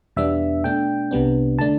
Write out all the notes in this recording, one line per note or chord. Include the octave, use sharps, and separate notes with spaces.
E2 B2 G3 B3 D4 E5
B2 A3 D4 G5
C2 C3 G3 B3 D4
D3 A3 D4 A5